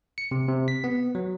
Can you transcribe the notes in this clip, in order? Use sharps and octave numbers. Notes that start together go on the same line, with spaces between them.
C#7
C3
C3
B6
B3
F#3